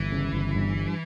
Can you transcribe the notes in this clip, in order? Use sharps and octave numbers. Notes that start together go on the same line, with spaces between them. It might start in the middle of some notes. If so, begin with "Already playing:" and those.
Already playing: G1 E3
C#3
G1
G2
G2